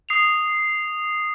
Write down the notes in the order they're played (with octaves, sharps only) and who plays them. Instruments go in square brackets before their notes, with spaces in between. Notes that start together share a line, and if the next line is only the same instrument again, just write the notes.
[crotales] D#6 C7 F7